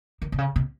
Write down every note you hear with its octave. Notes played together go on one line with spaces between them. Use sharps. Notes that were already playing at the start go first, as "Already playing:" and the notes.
D#3
C3
C#3
C3